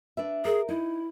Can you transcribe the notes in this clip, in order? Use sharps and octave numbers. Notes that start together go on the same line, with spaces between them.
D4 B4 E5
G#4 A#4
D#4 E4